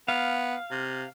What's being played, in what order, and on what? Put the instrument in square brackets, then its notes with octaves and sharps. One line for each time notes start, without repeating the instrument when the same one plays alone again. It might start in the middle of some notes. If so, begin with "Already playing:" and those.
[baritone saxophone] B3 [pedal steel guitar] F5
[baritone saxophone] C3